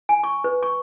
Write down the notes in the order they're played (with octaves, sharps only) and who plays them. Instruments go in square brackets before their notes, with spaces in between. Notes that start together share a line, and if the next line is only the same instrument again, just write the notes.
[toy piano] G#5
C#6
B4
C#6